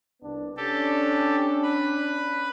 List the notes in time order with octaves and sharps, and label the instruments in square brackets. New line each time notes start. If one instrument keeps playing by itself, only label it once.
[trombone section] C2 B3 D4
[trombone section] C#4 D4 [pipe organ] G4 A4
[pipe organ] B4 B5